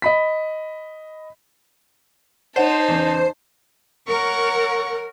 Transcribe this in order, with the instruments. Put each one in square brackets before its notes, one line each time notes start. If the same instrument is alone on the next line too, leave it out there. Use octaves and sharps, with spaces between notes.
[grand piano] D#5 B5 B6
[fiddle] D#4 A5 [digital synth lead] C5 [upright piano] C#5 F#5
[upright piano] E2 C#3
[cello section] A#4 [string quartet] C#5 F#5 C#6